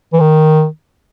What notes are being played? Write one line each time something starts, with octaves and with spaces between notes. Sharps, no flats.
E3
D#3